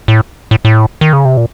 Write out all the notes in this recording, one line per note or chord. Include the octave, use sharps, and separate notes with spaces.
A2
A2
A2
D#3
C#3
C3
A#2